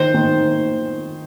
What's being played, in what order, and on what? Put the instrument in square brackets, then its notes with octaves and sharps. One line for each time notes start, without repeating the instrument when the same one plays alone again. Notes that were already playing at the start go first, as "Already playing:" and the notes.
Already playing: [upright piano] D#3 [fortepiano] C5
[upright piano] D#3